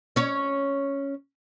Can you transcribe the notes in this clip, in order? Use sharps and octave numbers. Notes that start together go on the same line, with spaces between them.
C#4 C#5